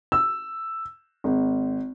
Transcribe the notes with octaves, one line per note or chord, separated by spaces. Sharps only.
E6
G#1